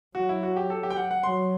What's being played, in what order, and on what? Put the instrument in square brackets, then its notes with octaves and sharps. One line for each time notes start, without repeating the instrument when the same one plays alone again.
[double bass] F#3 [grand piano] F#4
[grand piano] E4
F#4
G4
A4
G4
G5
F#5
F#5
[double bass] F#3 [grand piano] C6